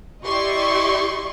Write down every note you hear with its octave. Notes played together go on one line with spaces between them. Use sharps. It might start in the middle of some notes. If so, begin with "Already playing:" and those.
E4 G4 D5 D#5 C6 C#6